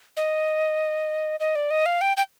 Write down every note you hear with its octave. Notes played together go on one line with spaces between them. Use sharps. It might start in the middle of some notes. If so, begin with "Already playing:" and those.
D#5
D#5
D5
D#5
F5
G5
G5